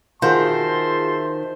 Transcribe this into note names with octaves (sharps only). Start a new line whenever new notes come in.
D#3 F4 F#4 G#4 C5 E5 A5 C6